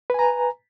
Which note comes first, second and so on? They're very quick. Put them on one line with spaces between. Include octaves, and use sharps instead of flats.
B4 G#5 A#5